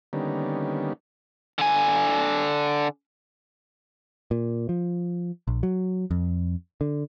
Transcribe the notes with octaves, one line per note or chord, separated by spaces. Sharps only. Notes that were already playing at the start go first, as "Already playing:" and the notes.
D3 D#3 G3 A#3 B3 C#4
D3 G#5
A#2
F3
A#1
F#3
F2
D3